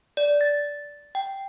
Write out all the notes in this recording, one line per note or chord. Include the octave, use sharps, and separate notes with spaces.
D5
A6
G5